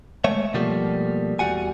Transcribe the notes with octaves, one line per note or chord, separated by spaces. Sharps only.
G#3 A3 C#5 E5
B2 F3 G3 A3 A#3
E2 G3 F#4 F#5 G#5